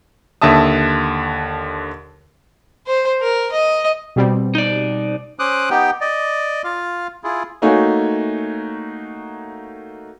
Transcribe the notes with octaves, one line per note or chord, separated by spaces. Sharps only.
D#2 D3 E5 A5 D#6
C5
A#4
D#5
B2 G3 C4
D#4 D5
C#4 C5 D6 D#6 F#6
B3 D#4 G4 G5
D5 D#5
F4 F5
E4 F4 G#4
A3 A#3 D#4 F#4 C#5 G#5